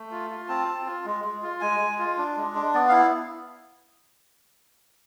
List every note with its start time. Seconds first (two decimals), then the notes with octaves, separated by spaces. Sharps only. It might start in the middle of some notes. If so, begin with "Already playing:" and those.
Already playing: A3
0.11 F4
0.30 F4
0.49 C4 A5
0.68 C4
0.86 F4
1.05 G#3
1.25 G#3
1.42 F4
1.61 G#3 G#5
1.80 G#3
1.99 F4
2.18 D4
2.37 G#3
2.55 D4
2.74 B3 D5
2.88 F5
2.92 E4